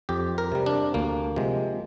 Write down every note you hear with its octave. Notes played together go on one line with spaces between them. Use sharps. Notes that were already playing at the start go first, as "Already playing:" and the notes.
F2 G4
A#4
C3 G3
D4
D2 A#3
C3 F3 G#3